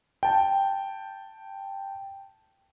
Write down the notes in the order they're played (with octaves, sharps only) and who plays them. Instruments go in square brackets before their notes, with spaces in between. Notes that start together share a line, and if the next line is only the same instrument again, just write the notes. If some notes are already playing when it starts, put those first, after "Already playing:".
[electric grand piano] G5 A5